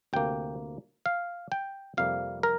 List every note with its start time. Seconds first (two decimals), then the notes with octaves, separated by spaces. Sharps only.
0.13 D2 C3 A#3 G5
1.06 F5
1.52 G5
1.97 F2 C3 G3 A#3 F5
2.43 A#4